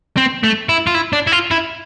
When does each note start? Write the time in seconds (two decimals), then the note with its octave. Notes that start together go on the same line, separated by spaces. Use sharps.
0.17 C4
0.44 A3
0.69 E4
0.87 F4
0.95 E4
1.13 D4
1.27 E4
1.32 F4
1.51 E4